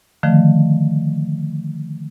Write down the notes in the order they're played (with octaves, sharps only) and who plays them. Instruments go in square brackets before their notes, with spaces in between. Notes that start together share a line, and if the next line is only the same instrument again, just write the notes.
[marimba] D3 D#3 F3 A3